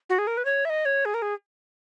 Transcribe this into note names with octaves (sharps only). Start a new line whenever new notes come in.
F#4
G#4
A#4
B4
C#5
E5
D#5
C#5
G#4
A#4
G#4